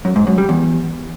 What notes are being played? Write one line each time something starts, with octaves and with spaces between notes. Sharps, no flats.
F#2
G#2
F#2
G3
E2